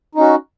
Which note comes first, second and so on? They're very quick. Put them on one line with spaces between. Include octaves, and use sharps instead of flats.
D#4 C#4 F#4